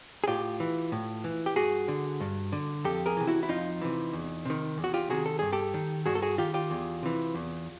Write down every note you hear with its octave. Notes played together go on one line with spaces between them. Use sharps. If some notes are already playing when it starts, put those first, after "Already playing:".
G#4
A2 F4 G4
E3
A2
E3
G4
G2 F#4 G#4
D3
G2
D3
F2 G4 A4
G#4 A#4
C3 E3
E4 F#4
E4
F2 D#4 F4
C3 E3
E2
C3 D#3
E2
F#4
F4 G4
C3 D#3 F#4 G#4
A4
G2 G#4
G4 A4
D#3
G2 F#4 G#4
A4
F#4 G#4
D#3 F4 G4
F4 G4
E2
C3 E3
E2